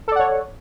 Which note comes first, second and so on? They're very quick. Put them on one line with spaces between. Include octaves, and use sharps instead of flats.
A4 D5 F#5 C#5